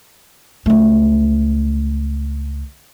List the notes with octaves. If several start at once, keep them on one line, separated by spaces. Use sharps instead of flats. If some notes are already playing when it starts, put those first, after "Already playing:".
C#2 A3